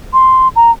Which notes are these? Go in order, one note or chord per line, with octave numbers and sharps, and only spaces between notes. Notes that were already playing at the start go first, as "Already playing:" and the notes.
C6
A#5